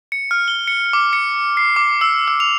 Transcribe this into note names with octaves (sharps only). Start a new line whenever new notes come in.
C#7
F6
G7
C#7
D6
C#7
C7
D6
E6
E6
F7